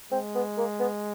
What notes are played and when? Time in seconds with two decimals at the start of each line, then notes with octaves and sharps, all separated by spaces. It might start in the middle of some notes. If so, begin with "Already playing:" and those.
0.11 G#3 C4
0.35 B3
0.57 A#3
0.79 B3